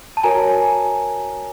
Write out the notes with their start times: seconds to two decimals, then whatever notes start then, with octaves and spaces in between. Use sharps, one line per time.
0.17 A5
0.23 F#4 A#4 C#5 G#5 A#5